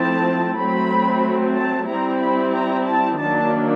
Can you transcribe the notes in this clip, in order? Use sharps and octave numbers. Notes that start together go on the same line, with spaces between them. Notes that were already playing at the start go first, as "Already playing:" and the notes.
Already playing: F3 A3 C4 E4 A5
F#3 A3 C4 B5
A5
G3 C4 E4 A#5
B5
A#5
A5
D#3 F#3 A#3 D4 A5